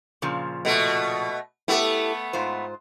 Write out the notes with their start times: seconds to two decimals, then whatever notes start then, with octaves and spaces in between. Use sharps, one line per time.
0.22 A#2 C#3 F3
0.65 B2 A3
1.68 A3 B3 E4 G4 A4
2.33 G#2 F4 C5